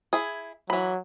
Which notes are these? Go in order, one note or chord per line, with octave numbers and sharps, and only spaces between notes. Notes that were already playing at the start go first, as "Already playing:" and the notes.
E4 G#4
E3 F#3 B5